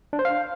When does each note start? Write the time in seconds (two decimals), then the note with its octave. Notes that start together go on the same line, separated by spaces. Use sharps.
0.13 D4
0.19 C5
0.25 F5